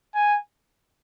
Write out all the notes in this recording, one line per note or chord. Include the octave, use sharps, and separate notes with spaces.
G#5